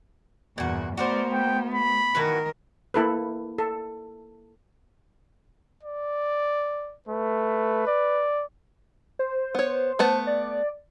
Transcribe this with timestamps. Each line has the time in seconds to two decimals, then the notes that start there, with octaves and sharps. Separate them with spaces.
0.58 E2 G2 A#2 F#4
0.97 A3 B3 F#4 A#4 C5 D5
1.32 G5
1.74 B5
2.15 D#3 E3 F#4 A#4 B4
2.94 A#3 E4 A4 B4
3.58 A4
5.83 D5
7.08 A3 B4
7.87 D5
9.19 C5
9.55 B3 C#5
9.99 A3 B3 A5
10.27 D5